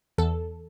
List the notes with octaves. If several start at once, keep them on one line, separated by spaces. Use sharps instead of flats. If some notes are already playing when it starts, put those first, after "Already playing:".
E2 A4